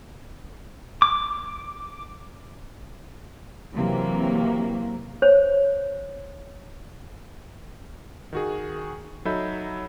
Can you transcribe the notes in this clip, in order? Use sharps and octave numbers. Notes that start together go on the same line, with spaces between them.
D6
C3 E3 F#3 A#3
C5 C#5
D#3 F#4 G#4
F#3 D#4 A4 E5 B5 G6